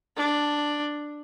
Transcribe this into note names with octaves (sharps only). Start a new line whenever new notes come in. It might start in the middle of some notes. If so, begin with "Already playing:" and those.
D4